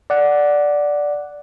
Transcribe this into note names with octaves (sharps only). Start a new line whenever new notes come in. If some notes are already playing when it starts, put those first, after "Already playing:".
D5 F#5